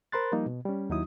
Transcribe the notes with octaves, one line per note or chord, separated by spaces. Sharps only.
A#4 C5 B5 C6 F#6 A6
F3 G3 A#3 D#4
B2
G3 C#4
D#2 F#3 D#4 E4 D#6